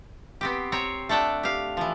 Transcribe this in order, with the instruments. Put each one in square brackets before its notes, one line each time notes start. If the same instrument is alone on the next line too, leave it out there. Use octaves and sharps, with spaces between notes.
[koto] B3 C4 G4
C4 C#5 A#5
A3 D4 F#5 G5 A5
G4 F5
E3 F3